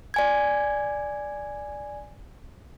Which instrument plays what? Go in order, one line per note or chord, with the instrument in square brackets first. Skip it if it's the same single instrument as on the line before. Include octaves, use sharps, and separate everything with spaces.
[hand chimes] D5 G#5 G#6